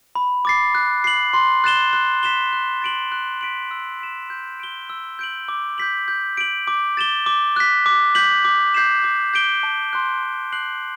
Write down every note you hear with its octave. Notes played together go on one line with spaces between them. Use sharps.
B5
D6 A6 C7
F#6
C7 F#7
C6
F#6 A6 E7 G7
F#6
B6 E7 G7
F#6
A6 D7 F#7
F#6
B6 D7 F#7
E6
B6 E7
G6
D7 G7
E6
G6 D7 F#7
D6
G6 B6 F#7
G6
D7 F#7
D6
A6 E7 G7
D6
F#6 B6
D6
G6 B6 F#7
D6
G6 C7 E7
D6
G6 D7 G7
A5
C6 F#6
C6
F#6 C7 F#7